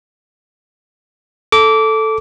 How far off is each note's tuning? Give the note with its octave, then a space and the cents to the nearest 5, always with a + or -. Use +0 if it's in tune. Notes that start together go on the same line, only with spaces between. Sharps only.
A4 +0 D6 -20